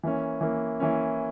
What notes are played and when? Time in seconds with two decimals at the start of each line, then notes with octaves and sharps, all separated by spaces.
0.03 E3 A#3 C#4
0.41 E3 A#3 C#4
0.80 E3 A#3 C#4